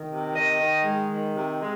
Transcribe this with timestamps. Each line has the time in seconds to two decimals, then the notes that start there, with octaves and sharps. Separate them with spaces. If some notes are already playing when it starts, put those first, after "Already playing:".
Already playing: D#3
0.09 C3
0.34 D#3 D#5
0.59 D#3
0.84 G#3
1.11 D#3
1.35 C3
1.60 G#3